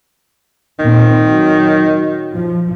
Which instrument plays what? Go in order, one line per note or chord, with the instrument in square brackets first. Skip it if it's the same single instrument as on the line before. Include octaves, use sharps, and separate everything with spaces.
[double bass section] A#2 C4 [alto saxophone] D#3
[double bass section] F#3
F3